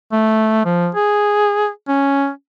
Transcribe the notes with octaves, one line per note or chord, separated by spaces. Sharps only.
A3
F3
G#4
C#4